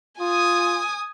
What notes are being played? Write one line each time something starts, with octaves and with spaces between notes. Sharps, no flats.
F4 G#5 D#6